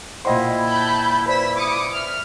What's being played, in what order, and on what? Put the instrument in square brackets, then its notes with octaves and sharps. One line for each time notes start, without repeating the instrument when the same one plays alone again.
[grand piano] A#2 D#5 C6 [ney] E4 [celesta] C5 F#5 G5
[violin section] A5 B5 G6
[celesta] B4 C5 D5 [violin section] E6 B6
[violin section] D6 D#6 C#7
[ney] E5 [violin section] F6